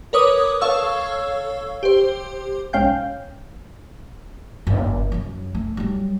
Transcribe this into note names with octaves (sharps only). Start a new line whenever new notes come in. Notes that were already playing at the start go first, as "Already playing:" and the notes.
A#4 B4 C#5 D6 D#6
A4 C#5 F5 C#6 E6
G4 C5
B1 G#2 C#4 F5 G5 G6
F#1
F#2 F#3
A3
F#3 G3